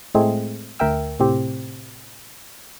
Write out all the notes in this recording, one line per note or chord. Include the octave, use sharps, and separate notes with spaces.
A2 G#3 A3 C4 G#4
D2 A#4 E5 G5 E6
A2 C3 C4 G4